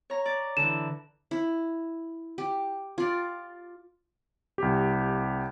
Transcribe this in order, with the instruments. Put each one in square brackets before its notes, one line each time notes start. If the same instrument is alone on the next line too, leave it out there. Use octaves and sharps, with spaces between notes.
[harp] C#5 A#5
D5
[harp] D3 E3 [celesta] E7
[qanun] E4
G4
F4 D5
[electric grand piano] C2 G4